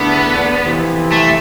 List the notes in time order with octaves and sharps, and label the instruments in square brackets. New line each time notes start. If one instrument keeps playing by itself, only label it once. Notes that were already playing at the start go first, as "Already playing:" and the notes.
Already playing: [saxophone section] E2 D3 A3 D4 [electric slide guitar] B3
[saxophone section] F2 C3 E3
[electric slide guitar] A3